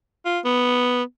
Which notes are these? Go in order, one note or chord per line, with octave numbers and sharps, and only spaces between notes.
F4
B3